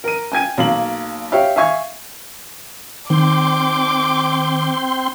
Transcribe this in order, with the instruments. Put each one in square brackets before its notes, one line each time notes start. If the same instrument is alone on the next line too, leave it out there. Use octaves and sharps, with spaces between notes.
[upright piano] A#4 D#7
G5 G#5 G#6 D#7
B1 A#3 F#7
G4 C#5 E5 F5 G5
E5 F5 G#5 C#6 G#6
[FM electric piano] D#3 [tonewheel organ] C4 C6 [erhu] D6